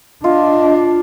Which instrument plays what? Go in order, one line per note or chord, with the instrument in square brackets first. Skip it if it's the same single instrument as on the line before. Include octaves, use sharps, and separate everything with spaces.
[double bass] D4 [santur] F4 [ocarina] D#5